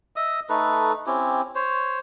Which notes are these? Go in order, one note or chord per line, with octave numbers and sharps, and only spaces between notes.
D#5 E5 D#6
A3 D#4 A4 B4
C4 C#4 E4 G4
C5 C#5